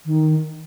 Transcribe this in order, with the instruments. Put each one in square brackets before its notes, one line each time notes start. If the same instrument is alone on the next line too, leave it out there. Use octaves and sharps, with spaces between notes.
[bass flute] D#3